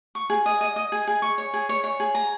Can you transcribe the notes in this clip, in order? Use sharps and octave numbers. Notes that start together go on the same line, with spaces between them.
C#6
G#4
D#5
D#5
D#5
G#4
G#4
C#6
C#5
G#4
C#5
C#5
G#4
A#5